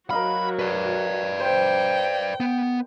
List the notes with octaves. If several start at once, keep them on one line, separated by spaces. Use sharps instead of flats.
F#3 F#4 A#4 D#5 F5 B5
B4 D5
C5 G5
B3